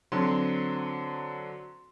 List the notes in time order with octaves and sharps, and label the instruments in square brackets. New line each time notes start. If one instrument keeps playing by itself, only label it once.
[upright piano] D3 F#3 C4 C6